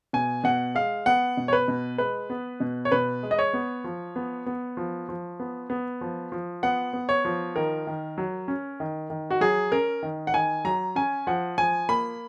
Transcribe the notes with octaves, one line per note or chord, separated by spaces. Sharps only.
B2 G#5
B2 F#5
G#3 F5
B3 F#5
B2
C#5
B4
B2
G#3 B4
B3
B2
C#5
B2 B4
G#3
D#5
C#5
B3
F3
B3
B3
F3
F3
B3
B3
F3
F3
B3 F#5
B3
C#5
F3
D#3 A#4
D#3
F#3
C#4
D#3
D#3
F#4
F#3 G#4
C#4 A#4
D#3
F#5
D#3 G#5
F#3 A#5
C#4 G#5
F3 F#5
F3 G#5
A#3 B5